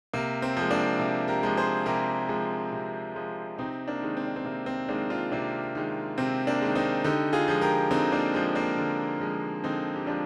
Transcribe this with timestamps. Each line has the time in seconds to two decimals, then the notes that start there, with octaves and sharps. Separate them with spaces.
0.13 C3 A#3
0.42 C4
0.57 F3 G#3
0.71 A#3 D4
0.99 C3
1.28 G4 A#4
1.43 F3 G#3
1.57 G#4 C5
1.86 C3 G4 A#4
2.29 F3 G#3
2.73 C3
3.16 F3 G#3
3.58 C3 C4 D#4
3.88 A#3 D4
4.02 D#3 G#3
4.17 C4
4.26 D4
4.36 C4
4.45 C3 A#3
4.66 C4
4.88 D#3 G#3 A#3 D4
5.10 D4 F4
5.32 C3 A#3 D4
5.75 D#3 G#3
6.18 C3 C4
6.47 A#3 D4
6.61 D#3 G#3
6.75 C4 D#4
7.04 D3 D#4 G4
7.33 F4 G#4
7.48 F3 G#3
7.61 G4 A#4
7.91 D3 C4 D#4
8.12 A#3 D4
8.34 F3 G#3
8.55 A#3 D4
8.77 D3
9.20 F3 G#3
9.64 D3 C4 D#4
9.95 G4
10.06 F3 G#3 D4 F4